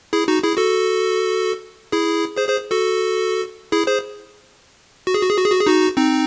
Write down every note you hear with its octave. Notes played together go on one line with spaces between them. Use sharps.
E4 G#4
D#4 F#4
E4 G#4
F#4 A4
E4 G#4
G#4 C5
G#4 C5
F#4 A4
E4 G#4
G#4 C5
F#4
G#4
F#4
G#4
F#4
G#4
F#4
G#4
D#4 F#4
C4 D#4